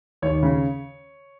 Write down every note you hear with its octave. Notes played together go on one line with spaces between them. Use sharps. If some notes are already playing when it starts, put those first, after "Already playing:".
D#2 C#5
C#3